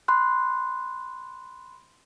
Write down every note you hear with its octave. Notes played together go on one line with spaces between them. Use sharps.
B5 C6 F#6